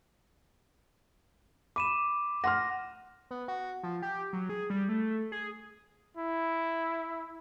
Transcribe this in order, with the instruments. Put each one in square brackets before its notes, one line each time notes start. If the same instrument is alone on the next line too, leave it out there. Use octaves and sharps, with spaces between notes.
[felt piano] B5 [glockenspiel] D6 D#7 E7
[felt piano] F#5 C6 F6 [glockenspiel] A#6
[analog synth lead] B3
F#4
F3
G4
F#3
G#4
G3
A3
G#4
[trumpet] E4